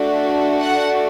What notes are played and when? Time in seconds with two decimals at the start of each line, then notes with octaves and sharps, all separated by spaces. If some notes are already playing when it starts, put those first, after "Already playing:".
Already playing: A3 D4 F#4
0.60 F#5